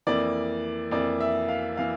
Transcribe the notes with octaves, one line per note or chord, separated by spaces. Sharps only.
F2 E3 A#3 D5
F2 E3 A#3 D5
E5
F5
E3 A#3 F5